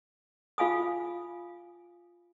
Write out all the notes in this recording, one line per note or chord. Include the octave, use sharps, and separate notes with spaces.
F4 F5 G#5 D#6